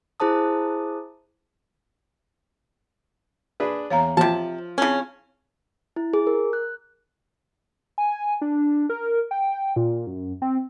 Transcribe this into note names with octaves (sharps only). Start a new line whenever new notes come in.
E4 G#4 C5 A5 D#6
D4 G#4 B4
E2 C#5 F5 A#5
C3 F3 A5
C#3 C4 C#4 E4
E4
G#4
A#4
F#6
G#5
D4
A#4
G5
A#2
F#2
C4